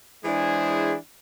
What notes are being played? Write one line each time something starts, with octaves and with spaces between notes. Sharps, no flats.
E3 G#3 D4 E4 G#4 C5